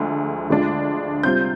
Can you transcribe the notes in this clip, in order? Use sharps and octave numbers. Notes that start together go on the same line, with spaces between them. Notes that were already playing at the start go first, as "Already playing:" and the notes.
Already playing: D2 D3 F3 G#3
D2 D3 G#3 D4 F4
C3 G3 C4 F4 G6